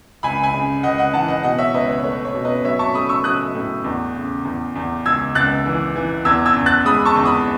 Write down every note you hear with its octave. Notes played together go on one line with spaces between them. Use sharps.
C#2 G#5 B5
G#5 B5
C#3
C#2 D#5 F#5
D#5 F#5
E3 F#5 A5
D#5 F#5
B2 D#5 F#5
C#5 E5
C#2 B4 D#5
C#5
A3 C#5
C#5
B2
B4 D#5
F#3 C#5 E5
A5 C#6
A3 B5 D#6
C#6 E6
F#3 D#6 F#6
A2
E2
C#3
E2
E2
C#2 E6 G#6
C#2 F#6 A6
E3
E3
E2 E6 G#6
E6 G#6
E2
F#6 A6
G#3 B5 D#6
A5 C#6
E2
B5 D#6